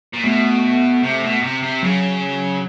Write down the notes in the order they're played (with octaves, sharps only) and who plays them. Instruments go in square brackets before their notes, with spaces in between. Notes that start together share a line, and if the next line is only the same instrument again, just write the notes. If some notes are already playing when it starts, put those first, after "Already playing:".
[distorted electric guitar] A#2
[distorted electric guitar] B2 [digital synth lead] A3
[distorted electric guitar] C3
B2
C3
C3
[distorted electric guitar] C#3 [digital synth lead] F#3